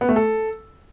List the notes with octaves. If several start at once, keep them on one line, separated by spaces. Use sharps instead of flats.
B3
A3
A4